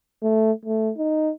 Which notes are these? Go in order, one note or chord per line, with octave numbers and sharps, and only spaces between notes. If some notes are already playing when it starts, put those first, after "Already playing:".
A3
A3
D#4